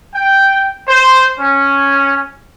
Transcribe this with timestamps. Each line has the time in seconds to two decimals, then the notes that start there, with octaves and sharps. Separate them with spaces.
0.15 G5
0.88 C5
1.39 C#4